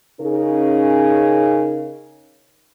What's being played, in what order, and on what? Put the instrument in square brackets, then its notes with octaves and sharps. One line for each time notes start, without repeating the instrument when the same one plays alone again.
[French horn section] C#3 C#4 D#4 G#4 A#4